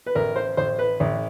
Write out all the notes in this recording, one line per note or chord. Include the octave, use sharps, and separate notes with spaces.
B4
A1 A#4
C5
A1 C5
B4
A1